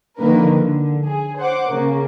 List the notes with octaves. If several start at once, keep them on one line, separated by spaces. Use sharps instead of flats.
D3 D#3 F3 A#3 A#4 B4
D3
G#4
C5 F#5 D6
C#3 A#3